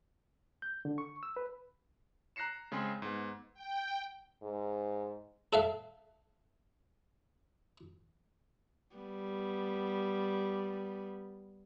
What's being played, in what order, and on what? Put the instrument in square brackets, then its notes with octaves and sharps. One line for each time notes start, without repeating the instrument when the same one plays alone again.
[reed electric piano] G6
D3
C#6
E6
B4
[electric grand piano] A#5 F#6 A#6 C7 C#7 E7
C#3 G#3 C4 G#4 C6
G#2 B3
[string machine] G5
[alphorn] G#2
[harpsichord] A4 E5 F5
[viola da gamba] G3 B3